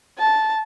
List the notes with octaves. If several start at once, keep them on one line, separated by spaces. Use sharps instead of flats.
A5